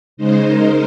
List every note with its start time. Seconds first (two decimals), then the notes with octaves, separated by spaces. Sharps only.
0.17 C#3 G#3 D#4 C5
0.46 A#4